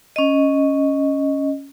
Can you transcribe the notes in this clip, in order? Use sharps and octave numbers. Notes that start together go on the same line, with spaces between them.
C#4 D#5